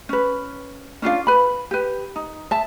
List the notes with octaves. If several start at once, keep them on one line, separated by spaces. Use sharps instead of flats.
C#4 B4
C#4 D4 F4 F5
B4 B5
G4 B4
D#4
E5 A5